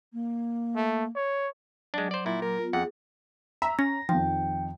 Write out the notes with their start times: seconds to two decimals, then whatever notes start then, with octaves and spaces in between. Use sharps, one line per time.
0.13 A#3
0.76 A3
1.15 C#5
1.94 F#3 G#3 D4 D6
2.11 C5 D5
2.26 A#2 E4
2.42 A#4
2.58 B3 F4
2.73 F2 G#4 F#5
3.62 E5 A#5
3.79 C#4 A#6
4.09 F2 D#3 F3 G5